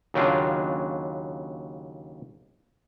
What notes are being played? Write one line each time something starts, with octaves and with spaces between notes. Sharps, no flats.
D#2 C#3 F#3 D4 F4